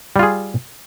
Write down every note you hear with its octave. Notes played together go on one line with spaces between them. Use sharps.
G3 F4 G#4